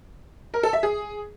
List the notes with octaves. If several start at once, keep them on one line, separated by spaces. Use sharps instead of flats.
A#4
A4
E5
G#4